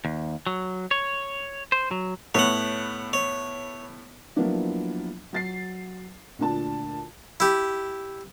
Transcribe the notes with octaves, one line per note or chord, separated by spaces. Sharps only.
D#2
F#3
C#5
C5
F#3
A2 B3 C#5 F#5
C#5
F3 F#3 A#3 B3 D4 E4
F#3 A6 C7
D2 A#2 D4 A5
E4 G4